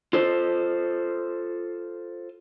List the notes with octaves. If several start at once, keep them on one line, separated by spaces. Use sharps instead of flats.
F4 A4 C5